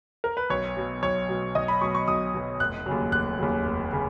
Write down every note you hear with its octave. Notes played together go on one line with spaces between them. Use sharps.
A#4
B4
B1 C#5
B2 F#3
B1 C#5
B2 F#3
B1 D#5
B5
B2 F#3 C#6
C#6
B1 D#6
B2 F#3
F1 F#6
D#2 C#3 F#3
F1 F#6
D#2 C#3 F#3
F1
C#3